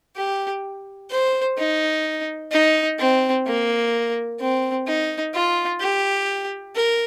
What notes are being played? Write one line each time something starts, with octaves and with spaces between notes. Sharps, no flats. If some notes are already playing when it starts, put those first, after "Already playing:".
G4
C5
D#4
D#4
C4
A#3
C4
D#4
F4
G4
A#4